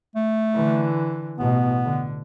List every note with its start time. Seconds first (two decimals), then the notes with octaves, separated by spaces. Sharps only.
0.16 A3
0.54 D3 E3
1.39 A1 B2 B3
1.85 D3